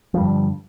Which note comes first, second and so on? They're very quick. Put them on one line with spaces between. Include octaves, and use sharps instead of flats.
F3 G3 G2 D3